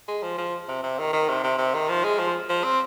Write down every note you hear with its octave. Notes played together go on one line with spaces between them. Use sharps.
G#3
F3
F3
C3
C3
D#3
D#3
C3
C3
C3
D#3
F3
G#3
F3
F3
C4